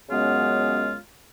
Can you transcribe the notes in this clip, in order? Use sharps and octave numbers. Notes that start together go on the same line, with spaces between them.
F#2 C#3 G#3 B3 F4